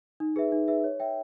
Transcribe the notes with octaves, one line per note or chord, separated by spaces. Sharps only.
D#4
G#4 B4 E5
D#4
G#4 B4 E5
C#5
E5 G5